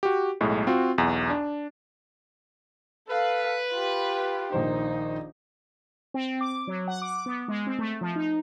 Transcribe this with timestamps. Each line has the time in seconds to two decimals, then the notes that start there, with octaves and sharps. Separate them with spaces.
0.03 F#4 G4
0.41 B1 A2 G#3
0.67 C4 F4 F#4
0.98 B1 E2
1.30 D4
3.09 A4 B4 F5
3.72 F4 G4
4.52 A#1 D#3 D#4 C5
6.14 C4
6.41 D6
6.67 F#3
6.88 F#5
7.02 D6
7.26 B3
7.48 G#3
7.67 C4
7.79 A3
8.01 F3
8.16 D#4